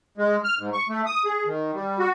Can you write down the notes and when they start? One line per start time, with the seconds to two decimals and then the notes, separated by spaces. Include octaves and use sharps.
0.18 G#3
0.44 F6
0.59 G#2
0.73 C#6
0.89 A3
1.06 D#6
1.25 G#4
1.46 D#3
1.74 G3
1.99 F#4